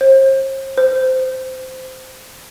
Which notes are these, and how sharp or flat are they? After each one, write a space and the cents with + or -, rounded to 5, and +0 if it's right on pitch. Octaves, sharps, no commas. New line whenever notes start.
C5 +40
C5 -10